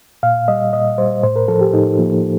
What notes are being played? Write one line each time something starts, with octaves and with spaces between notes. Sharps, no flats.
A#2 F5
G3 D#5
A#2 D#5
G3 C5
A2 C5
A#4
F3 A4
G4
A2 D#4
F3 A#3